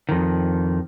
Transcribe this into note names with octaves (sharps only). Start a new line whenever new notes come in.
F2 D#3